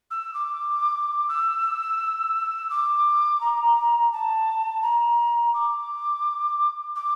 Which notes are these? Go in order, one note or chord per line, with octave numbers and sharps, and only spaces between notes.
E6
D6
E6
D6
A#5
A5
A#5
D6
D6